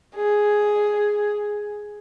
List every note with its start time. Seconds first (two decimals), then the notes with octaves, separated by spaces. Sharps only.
0.16 G#4